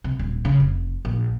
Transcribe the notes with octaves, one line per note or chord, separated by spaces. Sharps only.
C3
D#1
C#3
F1
A#1